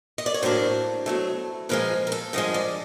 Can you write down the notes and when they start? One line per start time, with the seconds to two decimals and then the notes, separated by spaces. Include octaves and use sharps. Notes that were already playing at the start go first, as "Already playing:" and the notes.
0.18 D#5
0.26 D5
0.34 C#5
0.42 A2 F#3 A#3 D4 C5
1.06 B2 F#3 A3
1.69 A#2 F3 G#3 B4
2.07 A#4
2.12 A4
2.33 G2 D3 F3 G#3 D#5
2.54 D5